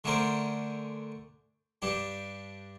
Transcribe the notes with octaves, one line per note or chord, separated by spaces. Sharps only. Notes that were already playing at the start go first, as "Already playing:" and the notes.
D3 A3 C#4 D4 A#4 C5
G2 D4 G4